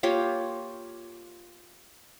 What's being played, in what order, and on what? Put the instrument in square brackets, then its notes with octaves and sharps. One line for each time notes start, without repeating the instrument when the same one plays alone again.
[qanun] A#3 F4 G4 C#5